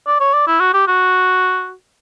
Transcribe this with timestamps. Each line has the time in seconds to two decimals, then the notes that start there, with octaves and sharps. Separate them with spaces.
0.07 D5
0.21 C#5
0.33 D5
0.47 E4
0.60 F#4
0.74 G4
0.87 F#4